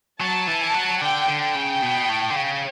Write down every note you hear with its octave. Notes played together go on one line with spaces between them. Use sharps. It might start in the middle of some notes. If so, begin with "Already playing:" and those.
F#3 A5
E3
A5
F#3
D3 G5
D3
G5
C#3
B2
A2
D3
C#3